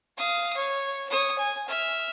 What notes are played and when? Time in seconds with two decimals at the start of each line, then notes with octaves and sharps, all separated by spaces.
0.17 F5 D#6
0.56 C#5
1.09 C#5 D#6
1.38 G#5
1.68 E5 F6